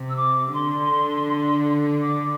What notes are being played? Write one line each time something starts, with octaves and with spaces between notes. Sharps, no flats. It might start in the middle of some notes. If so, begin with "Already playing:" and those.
Already playing: C3
E6
D6
D3 C6
D6